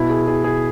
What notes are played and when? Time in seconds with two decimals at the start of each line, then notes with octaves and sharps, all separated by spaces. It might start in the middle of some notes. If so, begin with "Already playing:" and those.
Already playing: B2 E4
0.10 G#4
0.27 G#4
0.44 G#4